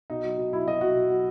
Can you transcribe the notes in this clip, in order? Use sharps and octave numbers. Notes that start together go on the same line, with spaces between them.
B2 D#4
F#3
B2
F#3 E4
B2 D#5
F#3 F#4
B2
F#3